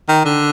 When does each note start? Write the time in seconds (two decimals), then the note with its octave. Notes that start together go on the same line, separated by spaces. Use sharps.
0.08 D#3
0.25 D3